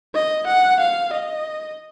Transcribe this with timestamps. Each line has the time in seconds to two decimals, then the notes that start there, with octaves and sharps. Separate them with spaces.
0.14 D#5
0.47 F#5
0.80 F5
1.13 D#5